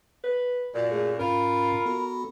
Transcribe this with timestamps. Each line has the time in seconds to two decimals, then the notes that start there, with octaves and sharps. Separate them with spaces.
0.24 B4
0.74 F#2 A#2 D5
0.91 A3 G#4
1.20 G#2 C#4 F4 A#4 B5
1.86 B3 F#4 A4